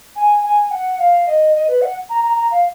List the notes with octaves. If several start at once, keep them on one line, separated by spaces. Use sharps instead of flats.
G#5
G#5
F#5
F5
D#5
D#5
B4
F#5
A#5
A#5
A#5
F5